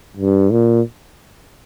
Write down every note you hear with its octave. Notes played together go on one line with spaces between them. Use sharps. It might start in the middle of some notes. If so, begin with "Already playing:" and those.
G2
A#2